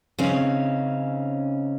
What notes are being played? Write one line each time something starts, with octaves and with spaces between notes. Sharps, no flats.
C#3 C4 C#4 D#4